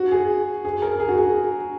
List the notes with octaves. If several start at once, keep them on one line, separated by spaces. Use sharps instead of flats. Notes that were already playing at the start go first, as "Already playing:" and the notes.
Already playing: F#4
G#4
G#4
A#4
G#4
F#4
G#4